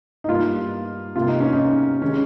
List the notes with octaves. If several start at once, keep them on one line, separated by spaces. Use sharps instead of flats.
D#4
G2 G3 A#3 F4
C3 G3 A#3 F4
D#4
C#4
D#4
D#3 G#3 C#4